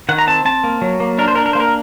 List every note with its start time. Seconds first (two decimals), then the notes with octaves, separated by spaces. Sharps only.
0.09 D#3 F#5
0.19 A#5
0.27 C4 A5
0.45 C4 A5
0.64 A#3
0.82 F#3
1.00 A#3
1.18 D4 A#4
1.28 C5
1.35 D4 A#4
1.46 A#4
1.53 A#3 C5
1.60 A#4